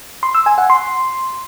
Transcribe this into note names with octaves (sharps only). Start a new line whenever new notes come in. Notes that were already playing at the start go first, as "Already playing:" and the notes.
C6
E6
G#5
F#5
C6